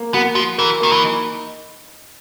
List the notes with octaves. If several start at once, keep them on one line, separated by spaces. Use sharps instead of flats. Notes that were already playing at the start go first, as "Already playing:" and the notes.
Already playing: A#3
B3 F#4
F3 F#4
E3 A#4
D#3 A#3
E3
D#4